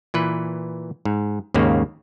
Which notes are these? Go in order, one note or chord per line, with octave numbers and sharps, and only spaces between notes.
A#2 E3 B4
G#2
D#2 G#2 C#3 A#3